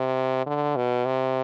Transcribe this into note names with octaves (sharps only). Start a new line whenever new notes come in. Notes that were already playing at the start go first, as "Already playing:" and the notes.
Already playing: C3
D3
B2
C3